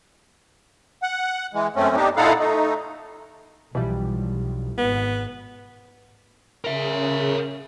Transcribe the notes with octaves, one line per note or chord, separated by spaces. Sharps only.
F#5
E3 G#3
F#2 A3 C4 C#4
B3 D4 D#4 G4
A#2 D#4 E4 A4 F5 F#5
A3 D#4
B1 B2 E3 F3 G3
G#1 B3
C#3 A#4 E5